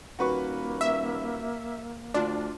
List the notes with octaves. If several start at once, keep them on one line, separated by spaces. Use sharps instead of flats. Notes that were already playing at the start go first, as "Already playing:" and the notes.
D#1 A#3 F#4 B4 C#6
E5
D2 D4 F4